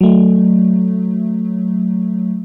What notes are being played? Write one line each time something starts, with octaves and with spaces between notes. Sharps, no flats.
F#3 A3